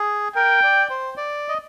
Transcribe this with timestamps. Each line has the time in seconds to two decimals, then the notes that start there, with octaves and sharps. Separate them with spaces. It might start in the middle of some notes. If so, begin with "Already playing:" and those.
Already playing: G#4
0.36 A#4 G5
0.63 D5
0.90 C5
1.17 D5
1.48 D#5